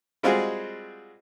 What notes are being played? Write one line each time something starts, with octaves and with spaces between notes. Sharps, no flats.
G3 G#3 C4 F4 F#4 G#4